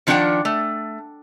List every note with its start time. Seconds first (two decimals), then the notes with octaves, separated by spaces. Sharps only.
0.07 D#3 F3 D4 D5 F#5 G5
0.45 A3